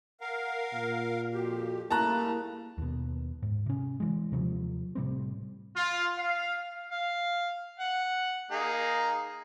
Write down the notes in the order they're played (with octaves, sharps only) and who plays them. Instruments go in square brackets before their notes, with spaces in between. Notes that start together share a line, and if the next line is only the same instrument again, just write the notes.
[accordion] A#4 F5 [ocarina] F#5
[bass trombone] A#2
[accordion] F2 G4 [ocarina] F#4
[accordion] C#3 G3 A3 [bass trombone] A#3 [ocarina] E4 [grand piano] A5 A#5 F#6
[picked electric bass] D#2 B2
G#2
C3 C#4
E3 G#3
D#2 C3 F3 F#3
A2 C3 G3 C4
[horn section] F4
F5
[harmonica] F5
F#5
A#3 D#4 G#4